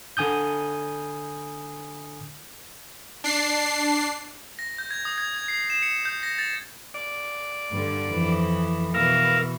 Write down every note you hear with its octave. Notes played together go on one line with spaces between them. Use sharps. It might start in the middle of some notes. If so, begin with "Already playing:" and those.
D3 G#5 D#6 G6
D4 C7
A#6
G6
G#6
D#6
G#6
G#6
C7
E7
C#7
G6
A#6
A6
D5
G2 D3
F2 E3
B2 E3 A#4 E5 F5